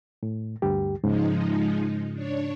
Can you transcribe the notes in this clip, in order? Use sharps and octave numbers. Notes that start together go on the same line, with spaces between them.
A2
D2 G2 G4
G#2 C#3 F3 G#3 D#4
D4 C#5